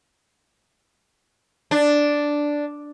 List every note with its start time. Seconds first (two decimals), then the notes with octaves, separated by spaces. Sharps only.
1.71 D4